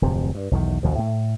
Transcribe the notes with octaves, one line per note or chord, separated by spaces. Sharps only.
D1 F2 C3
G2
B1 E2 D#3
A1 D2 B2 F3
A2